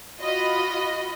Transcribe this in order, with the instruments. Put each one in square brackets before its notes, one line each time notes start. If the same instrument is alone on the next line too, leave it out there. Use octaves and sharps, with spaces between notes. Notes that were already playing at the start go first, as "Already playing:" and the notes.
[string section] F4 F#4 D#5 B5